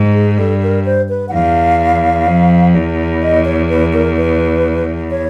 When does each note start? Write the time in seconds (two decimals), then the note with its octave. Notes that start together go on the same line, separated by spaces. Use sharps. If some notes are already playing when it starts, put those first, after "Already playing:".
Already playing: G#2
0.14 G#4
0.38 G2 A4
0.62 A#4
0.85 C5
1.09 B4
1.28 F#5
1.32 E2 F5
2.27 F2
2.74 E2
3.22 D#5
3.45 C#5
3.69 B4
3.93 A#4
4.17 B4
5.11 C#5